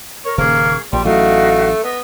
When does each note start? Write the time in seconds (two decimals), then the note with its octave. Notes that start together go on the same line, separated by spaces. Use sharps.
0.25 A#4 C#5
0.38 D#1 C#3 A#3 G#4 C#6
0.92 A#1 A#2 G3 G5 C6
1.05 A1 F#3 A3 D#4 F#4 F5
1.84 B3 D#5